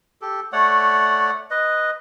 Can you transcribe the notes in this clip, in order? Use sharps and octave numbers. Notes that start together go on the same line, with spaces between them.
G4 A4
A3 C#5 D5 F#5
B4 D#5